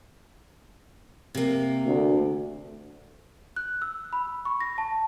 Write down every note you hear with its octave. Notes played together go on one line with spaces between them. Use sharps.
C3 A#3
D2
F#6
E6
B5
C#6
A#6
A5